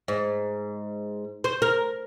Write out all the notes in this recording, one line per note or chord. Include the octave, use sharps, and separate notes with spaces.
G#2
C5
A#4